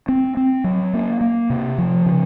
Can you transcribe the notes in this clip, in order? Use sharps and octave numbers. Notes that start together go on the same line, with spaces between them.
C4
C4
F#3
A#3
A#3
C3
F3
C#3